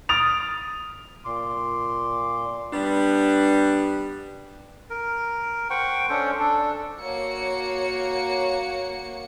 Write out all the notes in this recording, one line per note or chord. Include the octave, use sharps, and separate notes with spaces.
D#6 F6 A6 D7 F7
A#2 C6 D6
G3 B3 D4
A#4
C5 F#5 G5 C#6
C#4 D4 A4 C5
D4 A4
A#3 F#4 C#5 C#7